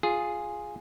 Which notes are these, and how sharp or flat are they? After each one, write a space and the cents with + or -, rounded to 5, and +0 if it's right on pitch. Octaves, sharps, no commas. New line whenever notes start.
F4 +5 G#4 +0